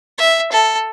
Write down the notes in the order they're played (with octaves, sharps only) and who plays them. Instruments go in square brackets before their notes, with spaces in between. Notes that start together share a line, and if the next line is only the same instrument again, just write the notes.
[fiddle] E5
A4